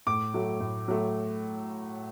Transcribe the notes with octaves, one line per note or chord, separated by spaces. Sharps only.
A2 D6
F#3 A3
A2
F#3 A3